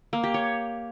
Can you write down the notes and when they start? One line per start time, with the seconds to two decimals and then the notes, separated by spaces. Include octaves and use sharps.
0.13 A#3
0.24 G4
0.34 C#5